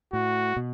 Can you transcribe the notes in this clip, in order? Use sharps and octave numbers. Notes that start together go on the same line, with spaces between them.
A2 F#4
B2